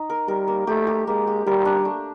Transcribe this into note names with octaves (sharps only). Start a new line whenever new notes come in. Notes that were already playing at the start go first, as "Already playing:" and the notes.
Already playing: D#4
A#4
G3 A#4
A#3
A3 G4
G4
G#3 A#3
G4
G3 A#4
D4
A3